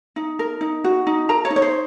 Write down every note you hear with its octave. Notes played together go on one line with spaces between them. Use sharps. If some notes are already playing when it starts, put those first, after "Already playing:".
D#4
A#4
D#4
F#4
D#4
A#4 A#5
C#5
D#4
C#5
C5